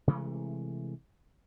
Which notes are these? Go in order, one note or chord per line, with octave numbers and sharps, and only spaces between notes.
C3 E3 G#3 A3